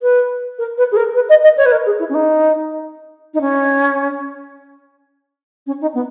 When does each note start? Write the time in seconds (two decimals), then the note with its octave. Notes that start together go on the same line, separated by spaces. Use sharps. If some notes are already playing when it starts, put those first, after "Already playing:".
0.02 B4
0.58 A#4
0.77 B4
0.92 G#4
0.96 A#4
1.15 B4
1.29 D#5
1.43 D#5
1.57 C#5
1.65 B4
1.71 A#4
1.86 G#4
1.99 E4
2.09 C#4
2.14 D#4
3.34 D#4
3.41 C#4
5.66 C#4
5.81 D#4
5.94 B3